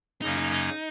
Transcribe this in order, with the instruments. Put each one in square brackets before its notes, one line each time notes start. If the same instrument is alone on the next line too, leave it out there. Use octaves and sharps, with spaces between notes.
[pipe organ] F#2 C#3 F#3 A#3 C#4 [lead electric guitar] D#4
[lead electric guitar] D#4
D#4